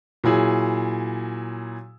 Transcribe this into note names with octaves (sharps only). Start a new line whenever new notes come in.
A#2 F#3 E4 G#4